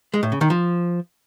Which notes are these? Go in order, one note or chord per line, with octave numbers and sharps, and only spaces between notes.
G#3
A2
C#3
D#3
F3